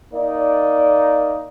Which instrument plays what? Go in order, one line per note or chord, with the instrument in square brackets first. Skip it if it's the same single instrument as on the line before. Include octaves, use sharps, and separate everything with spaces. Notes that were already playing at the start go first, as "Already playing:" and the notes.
[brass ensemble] A#3 D#4 D5